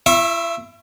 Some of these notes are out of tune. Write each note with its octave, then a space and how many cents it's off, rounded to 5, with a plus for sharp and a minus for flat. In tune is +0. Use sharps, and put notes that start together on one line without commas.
E4 +40 E5 +0 C#6 -30